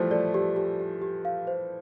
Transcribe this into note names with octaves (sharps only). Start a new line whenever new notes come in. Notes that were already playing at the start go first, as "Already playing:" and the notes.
Already playing: E3 F3 G3 A3 C5
A3 D5
G4
G4
G4
G4
F5
C5